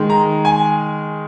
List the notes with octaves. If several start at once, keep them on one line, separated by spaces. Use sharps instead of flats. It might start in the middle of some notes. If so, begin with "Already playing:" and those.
Already playing: D#3 G#3
A#5
G#5